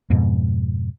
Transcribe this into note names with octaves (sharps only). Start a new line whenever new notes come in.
F2 G#2 B2